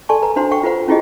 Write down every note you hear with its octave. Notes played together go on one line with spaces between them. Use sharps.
A4 D5 G#5 A5 C6 C#6
A4 B4 A#5
D4 F#4 C5 F#5 A#5 C6
A4 F#5 G5 C#6
F4 A4 B4 C5 F#5
C#4 E4 F4 G4 G#4 D#5